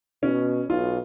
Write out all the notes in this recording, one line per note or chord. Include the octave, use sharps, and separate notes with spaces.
B2 C#4
B1 F4